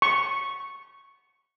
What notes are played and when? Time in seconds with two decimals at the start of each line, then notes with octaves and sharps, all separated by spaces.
0.02 C#6